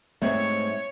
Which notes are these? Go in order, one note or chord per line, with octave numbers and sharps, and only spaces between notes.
G#2 G#3 A3 C4 C#5 E5